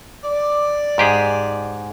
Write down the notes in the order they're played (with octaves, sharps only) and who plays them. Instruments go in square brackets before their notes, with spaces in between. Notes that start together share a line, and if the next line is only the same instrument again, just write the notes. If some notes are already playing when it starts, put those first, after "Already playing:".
[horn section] D5
[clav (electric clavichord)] G#2 G4 G#4